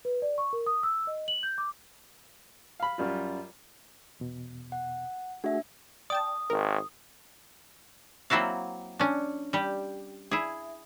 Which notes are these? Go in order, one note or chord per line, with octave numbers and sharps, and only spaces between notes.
B4
D5
C#6
A#4
D#6
E6
D#5
F#7
G6
D6
F5 B5
F#2 G3 F4
E2 B2
F#5
A3 D4 F#4 G#4 E5
D5 G5 A5 D#6
G#1 A#4
F#3 A#3 C4 E4 F#4 F5
C#4 D4
G3 G4
E4 G#4